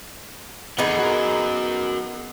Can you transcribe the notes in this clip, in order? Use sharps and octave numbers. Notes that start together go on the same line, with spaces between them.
E2 B3 D#4 G#4 A4 F#5
F#4 A#4